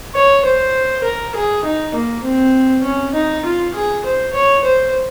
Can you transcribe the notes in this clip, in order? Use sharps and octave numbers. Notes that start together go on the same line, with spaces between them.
C#5
C5
A#4
G#4
D#4
A#3
C4
C#4
D#4
F4
G#4
C5
C#5
C5